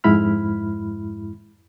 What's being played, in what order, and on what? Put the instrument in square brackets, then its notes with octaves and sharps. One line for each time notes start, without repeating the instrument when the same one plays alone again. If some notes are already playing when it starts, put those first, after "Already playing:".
[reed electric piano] F2 G#2 G#3 E4 B5 F6